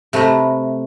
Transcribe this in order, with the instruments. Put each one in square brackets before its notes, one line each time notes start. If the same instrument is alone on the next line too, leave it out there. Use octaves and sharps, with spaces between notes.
[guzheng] C3 A3 B4 A#5